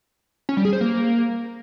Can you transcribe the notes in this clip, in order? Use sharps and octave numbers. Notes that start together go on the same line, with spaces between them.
C#4
G3
G#4
C5
A#3